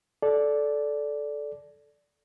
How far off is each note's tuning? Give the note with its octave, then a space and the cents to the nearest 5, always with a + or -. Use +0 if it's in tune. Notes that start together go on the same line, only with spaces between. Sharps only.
A4 -15 D5 -5